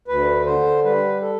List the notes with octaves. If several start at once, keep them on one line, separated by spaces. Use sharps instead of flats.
D2 B4
D3 C5
G3 B4
A4